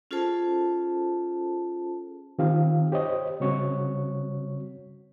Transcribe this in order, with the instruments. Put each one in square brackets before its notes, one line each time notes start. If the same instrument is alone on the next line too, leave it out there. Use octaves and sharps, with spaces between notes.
[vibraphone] C#4 F4 G#4 A4 C5 A5
[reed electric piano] D#3 C4 F4 G4 F5
G4 C5 C#5 D#5
C#3 G3 C4 F#4 C#5 C#6